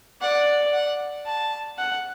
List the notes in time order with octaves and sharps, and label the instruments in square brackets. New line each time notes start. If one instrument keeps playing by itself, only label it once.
[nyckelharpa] D5 [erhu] F#5
[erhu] F#5
A5
[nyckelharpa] F#5